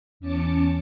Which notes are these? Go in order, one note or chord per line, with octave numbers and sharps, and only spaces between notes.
E2 C#4 A5 D6 C#7